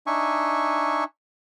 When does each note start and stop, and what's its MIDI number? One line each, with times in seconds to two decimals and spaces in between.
0.07 1.04 62
0.07 1.04 63
0.07 1.04 76
0.07 1.04 80
0.07 1.04 85